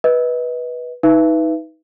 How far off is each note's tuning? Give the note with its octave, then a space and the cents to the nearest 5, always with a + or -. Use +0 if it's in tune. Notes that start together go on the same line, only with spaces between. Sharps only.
B4 -10 D#5 +25
D#4 +30 B4 +0 E5 +30